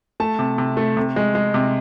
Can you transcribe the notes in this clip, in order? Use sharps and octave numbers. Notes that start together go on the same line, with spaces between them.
A3 A5
C3
C3
A3
C3
G#3
G#3
C3